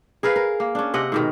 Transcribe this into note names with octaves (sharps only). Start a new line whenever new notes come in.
G#4 A#4 B4 F5
A#4
A#3
C#4 D4
C3 D#5 F#5
G#2 B2 D#3